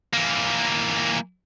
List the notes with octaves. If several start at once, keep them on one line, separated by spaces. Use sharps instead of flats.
E3 A#3